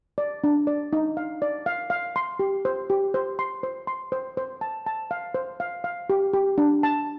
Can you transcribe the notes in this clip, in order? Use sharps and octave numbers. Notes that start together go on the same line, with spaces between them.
D5
D4
D5
D#4
F5
D5
F5
F5
C6
G4
C5
G4
C5
C6
C5
C6
C5
C5
A5
A5
F5
C5
F5
F5
G4
G4
D4
A5